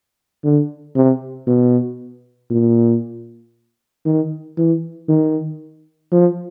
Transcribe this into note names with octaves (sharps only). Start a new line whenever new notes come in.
D3
C3
B2
A#2
D#3
E3
D#3
F3